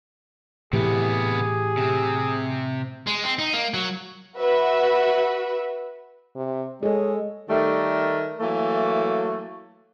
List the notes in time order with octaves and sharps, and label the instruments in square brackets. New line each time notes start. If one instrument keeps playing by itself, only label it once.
[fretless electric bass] A2 E3 [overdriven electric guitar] C3 B3 [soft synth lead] G4 [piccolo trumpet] G#4
[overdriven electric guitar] C3 C4
[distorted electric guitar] G#3
C4
D#4
A#3
F#3
[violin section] F#4 B4 E5
[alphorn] C3
[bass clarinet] G#3 [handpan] G#4 A4 [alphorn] C#5
[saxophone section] D#3 G3 A3
E3 F#3 A3 A#3